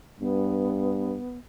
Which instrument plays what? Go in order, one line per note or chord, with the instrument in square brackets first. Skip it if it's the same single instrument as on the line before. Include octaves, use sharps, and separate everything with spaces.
[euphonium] G2 [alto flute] B3